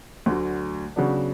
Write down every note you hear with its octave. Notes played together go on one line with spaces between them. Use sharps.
D2 D3 F#3
C#3 F#3 B3 D4